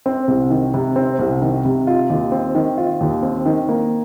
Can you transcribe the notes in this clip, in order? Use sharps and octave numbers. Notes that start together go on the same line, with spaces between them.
C4
C2
D#3
C3
C4
C2
D#3
C3
F4
D#2
C4
D#3
F4
D#2
C4
D#3
A#3